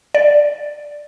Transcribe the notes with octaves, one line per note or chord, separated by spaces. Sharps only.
D5